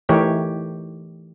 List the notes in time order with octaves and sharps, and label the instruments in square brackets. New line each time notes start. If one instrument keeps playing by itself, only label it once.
[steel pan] E3 A3 D#4 G4 A#4 C#5